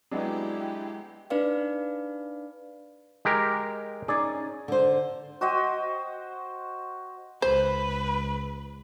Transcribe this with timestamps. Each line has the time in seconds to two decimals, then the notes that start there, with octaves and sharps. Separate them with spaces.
0.11 F#3 G#3 B3 D4 E4 G4
1.30 D4 D#4 B4 D5 F5
3.25 G#3 G4 A#4
4.08 C#4 D#4 G#4 D5
4.68 D3 C5
5.41 F#4 C5 D#5 G5
7.42 C#2 B4 C5